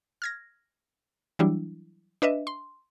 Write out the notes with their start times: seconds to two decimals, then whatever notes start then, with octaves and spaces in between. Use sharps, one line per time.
0.22 F6 G#6 A#6
1.39 E3 F#3 G3 D4 E4
2.22 D4 B4 D#5 E5
2.47 C6